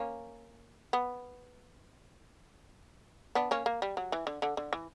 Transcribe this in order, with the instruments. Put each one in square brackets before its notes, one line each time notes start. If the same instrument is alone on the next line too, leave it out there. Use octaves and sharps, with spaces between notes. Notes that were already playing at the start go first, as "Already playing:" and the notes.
Already playing: [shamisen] A#3 C#4
B3
B3 D4
A#3 C#4
A#3
G3
F#3
E3
D3
D3
D3
E3